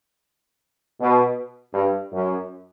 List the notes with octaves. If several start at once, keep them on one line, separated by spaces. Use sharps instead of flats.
B2
G2
F#2